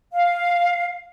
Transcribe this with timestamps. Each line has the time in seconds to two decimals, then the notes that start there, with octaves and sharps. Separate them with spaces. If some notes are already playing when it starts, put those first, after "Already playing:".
0.13 F5